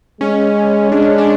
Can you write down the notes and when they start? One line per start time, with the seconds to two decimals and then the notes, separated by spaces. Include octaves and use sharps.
0.21 G#3 C#4
0.91 G#3 D4
1.18 D4